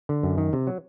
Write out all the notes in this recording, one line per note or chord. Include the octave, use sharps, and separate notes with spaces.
D3
F#2
D#3
C3
F#3